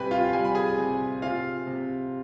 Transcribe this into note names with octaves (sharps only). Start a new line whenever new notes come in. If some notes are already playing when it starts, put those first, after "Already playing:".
Already playing: C3 G3 G4 B4 G#5 B5
F4 F5
G3 G#5
B5
G#4 G#5
C3
C3 F4 F5
C3